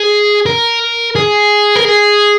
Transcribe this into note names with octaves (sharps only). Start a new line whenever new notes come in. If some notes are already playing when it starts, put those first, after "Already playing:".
Already playing: G#4
A#4
G#4
A#4
G#4